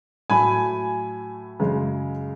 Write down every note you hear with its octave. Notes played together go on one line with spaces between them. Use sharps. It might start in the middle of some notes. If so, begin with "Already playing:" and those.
A2 F#3 A3 G#5 B5
F#2 C#3 G#3